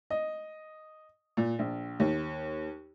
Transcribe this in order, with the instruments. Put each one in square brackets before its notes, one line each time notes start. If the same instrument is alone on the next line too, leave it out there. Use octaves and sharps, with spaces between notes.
[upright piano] D#5
A#2
A#1
D#2